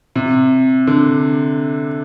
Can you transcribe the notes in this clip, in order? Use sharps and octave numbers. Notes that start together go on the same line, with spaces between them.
C3
D3